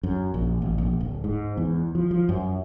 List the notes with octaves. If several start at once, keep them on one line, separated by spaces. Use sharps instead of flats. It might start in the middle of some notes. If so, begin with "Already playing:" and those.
F#2
A#1
A1
A#1
D1
G#2
E2
F3
F3
F#2